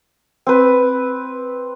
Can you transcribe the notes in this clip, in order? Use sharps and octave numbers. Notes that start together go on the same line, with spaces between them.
C4 B4